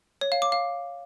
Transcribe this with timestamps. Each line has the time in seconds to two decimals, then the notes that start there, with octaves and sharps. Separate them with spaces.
0.21 C#5
0.32 F5
0.42 D6
0.52 F5